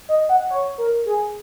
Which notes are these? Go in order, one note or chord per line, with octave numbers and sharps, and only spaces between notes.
D#5
F#5
C#5
A#4
G#4